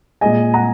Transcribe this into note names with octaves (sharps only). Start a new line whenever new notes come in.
A#2 G#3 D#5 G#5
F#5 A#5